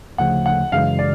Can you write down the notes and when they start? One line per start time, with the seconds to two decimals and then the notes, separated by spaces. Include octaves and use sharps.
0.18 D2 C#3 F3 A3 F#5
0.46 F#5
0.72 F#2 C#3 E3 G#3 F5
0.99 D5